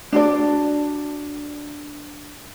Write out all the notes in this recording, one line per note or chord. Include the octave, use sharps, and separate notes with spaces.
D4 F#4 D5